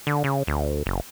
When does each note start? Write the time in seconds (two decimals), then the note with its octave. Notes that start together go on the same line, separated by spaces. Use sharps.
0.07 D3
0.24 C#3
0.47 D2
0.86 F#1